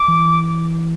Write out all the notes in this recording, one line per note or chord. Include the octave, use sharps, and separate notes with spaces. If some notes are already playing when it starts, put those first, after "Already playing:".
Already playing: D6
E3